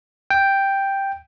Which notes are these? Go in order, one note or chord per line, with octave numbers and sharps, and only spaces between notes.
G5